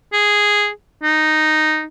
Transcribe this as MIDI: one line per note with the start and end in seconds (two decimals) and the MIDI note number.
0.13 0.69 68
1.03 1.84 63